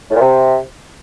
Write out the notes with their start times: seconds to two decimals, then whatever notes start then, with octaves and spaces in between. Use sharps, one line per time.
0.10 A2
0.16 A#2
0.21 C3